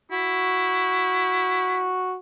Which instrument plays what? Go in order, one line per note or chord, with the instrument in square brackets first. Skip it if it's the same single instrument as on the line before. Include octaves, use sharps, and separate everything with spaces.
[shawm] E4 [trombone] F#4